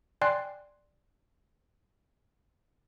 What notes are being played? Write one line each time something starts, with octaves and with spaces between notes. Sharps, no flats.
D5 G5 G#5 C6 F#6 C7